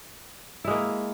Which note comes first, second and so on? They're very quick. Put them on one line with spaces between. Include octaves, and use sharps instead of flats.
E4 G#3 A#3